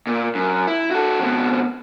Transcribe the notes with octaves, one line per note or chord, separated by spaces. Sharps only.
A#2
F#2
E4
F#4 A4
F2 B2